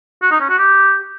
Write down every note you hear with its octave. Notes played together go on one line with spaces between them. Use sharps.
F#4
D#4
C#4
F#4
G4